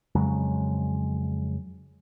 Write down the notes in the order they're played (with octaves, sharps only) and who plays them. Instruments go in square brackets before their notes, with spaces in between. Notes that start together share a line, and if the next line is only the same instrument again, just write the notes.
[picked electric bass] F2 C#3 F#3 G#3